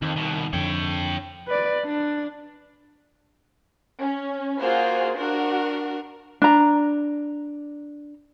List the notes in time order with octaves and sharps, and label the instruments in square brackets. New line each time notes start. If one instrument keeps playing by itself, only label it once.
[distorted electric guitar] F2 [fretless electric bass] D#3
[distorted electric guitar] C2 B2
[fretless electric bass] F2 D3 [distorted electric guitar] C#5 G5
[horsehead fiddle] B4 D5
D4
[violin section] C#4
[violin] A#3 F4 [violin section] F#4 G#4 C5
[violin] D4 A#4 [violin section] F#4
[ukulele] D4 A#5